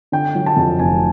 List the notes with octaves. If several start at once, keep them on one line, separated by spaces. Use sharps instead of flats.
D3 G5
F#3
A5
F2
F1 G#5